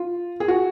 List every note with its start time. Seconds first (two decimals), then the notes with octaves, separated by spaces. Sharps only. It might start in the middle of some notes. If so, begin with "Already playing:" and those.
Already playing: F4
0.40 G#4
0.48 F#4